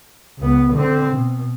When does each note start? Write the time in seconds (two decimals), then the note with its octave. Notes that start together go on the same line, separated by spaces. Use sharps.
0.38 C#2 B3
0.73 D3 C4
1.13 B2